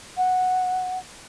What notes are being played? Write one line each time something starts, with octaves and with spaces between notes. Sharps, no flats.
F#5